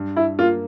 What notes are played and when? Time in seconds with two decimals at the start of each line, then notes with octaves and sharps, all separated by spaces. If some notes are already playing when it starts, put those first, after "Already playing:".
Already playing: G2
0.16 E4
0.39 A#3 F4